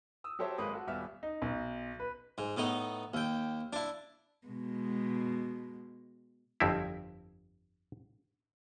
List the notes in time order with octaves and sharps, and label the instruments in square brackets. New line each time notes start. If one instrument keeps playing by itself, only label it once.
[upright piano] D#6 E6
F#3 G4 A4 C5 C#5 E5
G#1 G#3 A#3 B4 D#6
F#4 A4
D#1 G3 B3 E5 F6
[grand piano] D#4
B1
B4
[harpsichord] G#2
A2 B3 D#4
D#2 G5
D4 E4
[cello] B2 G#3
[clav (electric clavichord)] G1 F2 C4 E4